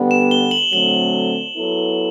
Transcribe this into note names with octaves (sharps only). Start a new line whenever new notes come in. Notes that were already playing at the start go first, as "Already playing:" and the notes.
Already playing: D3 G3 B3
E7
G7
F#7
D3 F#3 A3 C4 F#7
F#3 B3 E4 A4